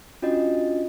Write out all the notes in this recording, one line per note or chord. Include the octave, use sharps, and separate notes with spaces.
C#4 D4 F4 F#4 D#5